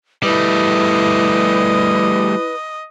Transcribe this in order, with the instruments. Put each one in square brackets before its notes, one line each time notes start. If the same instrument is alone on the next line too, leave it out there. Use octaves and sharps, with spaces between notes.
[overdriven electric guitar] G3 A3 [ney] E4 [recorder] B4 [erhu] D#5